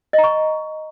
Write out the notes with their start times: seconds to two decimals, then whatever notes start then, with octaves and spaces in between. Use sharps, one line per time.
0.13 D#5
0.18 A#5
0.24 C#6